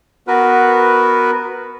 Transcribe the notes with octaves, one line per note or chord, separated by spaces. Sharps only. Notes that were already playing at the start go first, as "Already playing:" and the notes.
B3 F#4 A#4 B4